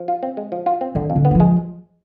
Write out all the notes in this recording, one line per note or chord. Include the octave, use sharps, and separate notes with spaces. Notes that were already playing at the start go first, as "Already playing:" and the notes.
Already playing: F3
F4
C4
G#3
F3
F4
C4
D3 D#3
F2
D3
B3
G3
F3
G#3